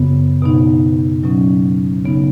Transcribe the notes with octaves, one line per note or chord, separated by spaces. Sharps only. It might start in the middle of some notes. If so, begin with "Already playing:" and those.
Already playing: F#2 C#3 B3
B2 B3 D#4
B2 F#3 C#4
C#3 B3 D#4